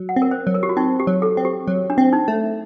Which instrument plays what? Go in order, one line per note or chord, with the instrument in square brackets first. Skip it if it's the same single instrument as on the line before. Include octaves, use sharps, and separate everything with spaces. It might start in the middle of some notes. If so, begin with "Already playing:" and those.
Already playing: [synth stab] F#3
[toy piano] F#5
[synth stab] C4
[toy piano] A#4
C5
[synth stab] F#3
[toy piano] A#4
G4
F#4
[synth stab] C4 [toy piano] D#4
[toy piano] G4
[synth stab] F#3
[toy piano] A4
[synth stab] C4
[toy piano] G4
[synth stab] F#3
[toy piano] D4
[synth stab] C4
[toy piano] D#4
[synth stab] A3